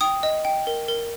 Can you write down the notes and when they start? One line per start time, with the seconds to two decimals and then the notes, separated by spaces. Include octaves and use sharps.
0.01 G5 D#6
0.23 D#5
0.45 G5
0.67 A#4
0.88 A#4